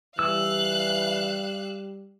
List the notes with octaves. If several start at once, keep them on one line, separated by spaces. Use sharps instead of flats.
E3 G3 F5 E6 F#6